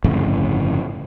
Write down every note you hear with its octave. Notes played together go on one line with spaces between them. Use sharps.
G1 F2 A2 C#3